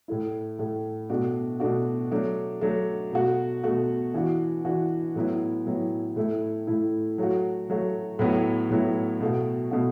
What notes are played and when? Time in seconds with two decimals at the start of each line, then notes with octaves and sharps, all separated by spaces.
0.08 A2 A3 E4
0.59 A2 A3 E4
1.10 B2 A3 D4 F#4
1.60 B2 A3 D4 F#4
2.11 F#3 A3 D4
2.61 F#3 A3 D4
3.12 B2 A3 F#4
3.64 B2 A3 F#4
4.14 E3 D4 F#4
4.65 E3 D4 F#4
5.16 A2 F#3 B3 E4
5.66 A2 F#3 B3 E4
6.16 A2 A3 E4
6.67 A2 A3 E4
7.18 F#3 A3 F#4
7.70 F#3 A3 F#4
8.19 A2 F#3 B3 E4
8.70 A2 F#3 B3 E4
9.20 B2 A3 F#4
9.71 B2 A3 F#4